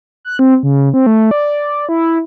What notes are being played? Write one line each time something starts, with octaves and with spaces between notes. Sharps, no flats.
F#6
C4
C#3
C4
A3
D5
E4